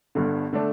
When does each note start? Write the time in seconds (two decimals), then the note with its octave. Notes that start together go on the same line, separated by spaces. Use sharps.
0.15 G1 G2 D3
0.53 D3 A3 D4